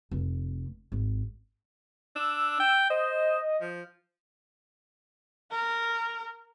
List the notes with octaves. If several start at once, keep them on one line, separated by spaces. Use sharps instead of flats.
F1
G#1
D4 E6
G5
C5 D#5
F3
A#4